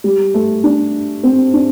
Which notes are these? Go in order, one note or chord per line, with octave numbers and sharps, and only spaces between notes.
G3
A3
D4
C4
D4